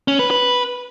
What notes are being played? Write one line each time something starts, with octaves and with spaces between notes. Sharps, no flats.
C#4
B4
B4